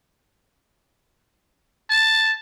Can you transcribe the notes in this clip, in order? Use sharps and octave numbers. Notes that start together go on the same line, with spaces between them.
A5